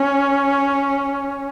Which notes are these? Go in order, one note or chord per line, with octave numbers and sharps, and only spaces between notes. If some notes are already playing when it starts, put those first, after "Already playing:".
Already playing: C#4